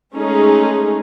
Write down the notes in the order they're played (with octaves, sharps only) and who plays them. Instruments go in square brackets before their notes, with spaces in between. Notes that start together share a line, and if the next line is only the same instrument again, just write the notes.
[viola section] G#3 A3 C#4 D#4 G#4